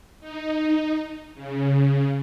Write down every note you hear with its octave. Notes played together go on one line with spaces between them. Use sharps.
D#4
C#3